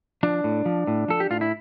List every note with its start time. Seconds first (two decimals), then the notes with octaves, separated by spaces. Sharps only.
0.23 F3 D4
0.44 A2
0.66 F3
0.87 A2
1.08 F3 A4
1.20 G4
1.30 A2 F4
1.41 E4